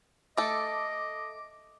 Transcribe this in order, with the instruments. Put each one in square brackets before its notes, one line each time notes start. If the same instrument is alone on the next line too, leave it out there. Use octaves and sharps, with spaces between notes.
[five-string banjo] A3 A4 [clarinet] D#5 [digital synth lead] D6